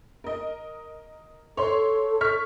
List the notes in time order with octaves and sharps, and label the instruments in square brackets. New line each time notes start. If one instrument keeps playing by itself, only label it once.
[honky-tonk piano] A#4 D#5
[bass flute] A4 [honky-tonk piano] C#5 C6
[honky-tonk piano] C#6 F6 B6